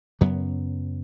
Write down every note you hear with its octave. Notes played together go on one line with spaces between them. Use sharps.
F#2 C#3 F#3 B3